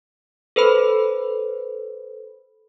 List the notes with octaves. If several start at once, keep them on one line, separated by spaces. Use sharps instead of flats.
A4 B4 C5 B5